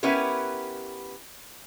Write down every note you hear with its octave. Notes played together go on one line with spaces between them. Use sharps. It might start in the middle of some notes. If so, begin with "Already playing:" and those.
B3 C#4 E4 G4 A#4 B4